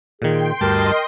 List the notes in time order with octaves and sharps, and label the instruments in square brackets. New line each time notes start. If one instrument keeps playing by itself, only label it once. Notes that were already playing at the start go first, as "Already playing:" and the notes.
[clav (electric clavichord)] A#2 D#3 [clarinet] G#4 [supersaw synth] G5 C6
[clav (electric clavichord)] D2 [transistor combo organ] G2 A5 [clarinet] A#4 [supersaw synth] D#5 C6